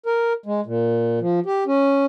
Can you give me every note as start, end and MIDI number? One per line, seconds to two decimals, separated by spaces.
0.06 0.33 70
0.46 0.61 56
0.66 1.19 46
1.21 1.40 53
1.46 1.64 67
1.67 2.06 61